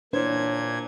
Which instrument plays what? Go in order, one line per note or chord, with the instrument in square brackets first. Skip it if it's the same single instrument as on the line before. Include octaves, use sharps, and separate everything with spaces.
[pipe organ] A#2 G#6 [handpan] D4 E4 [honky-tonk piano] C5 [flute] C#5